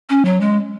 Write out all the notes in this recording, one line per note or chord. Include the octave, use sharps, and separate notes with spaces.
C#4
F#3
G#3